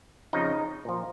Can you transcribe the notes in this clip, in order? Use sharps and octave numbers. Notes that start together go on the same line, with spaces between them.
F2 C#3 F3 D#4
A#2 F3